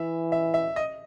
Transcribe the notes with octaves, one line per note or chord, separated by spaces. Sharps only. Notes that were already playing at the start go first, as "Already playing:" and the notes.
Already playing: E3 E5
E5
E5
D#5